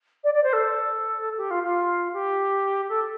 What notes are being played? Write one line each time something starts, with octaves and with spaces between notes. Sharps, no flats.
D5
D5
C5
A4
G4
F4
F4
G4
A4